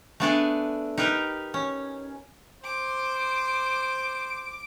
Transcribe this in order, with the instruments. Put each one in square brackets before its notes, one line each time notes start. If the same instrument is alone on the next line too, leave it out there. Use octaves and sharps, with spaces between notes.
[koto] A3 B3 D4 G#4 D5 G#5
D#4 G4 A#4 B4
C#4
[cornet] C5 [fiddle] D6